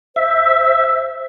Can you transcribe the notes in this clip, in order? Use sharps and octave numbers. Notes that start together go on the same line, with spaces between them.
C5 E5